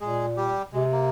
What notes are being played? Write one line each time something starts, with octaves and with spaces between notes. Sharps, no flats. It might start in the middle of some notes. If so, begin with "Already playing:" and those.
A#2 G#3 G#4
G3 G4
C3 G#3
A#3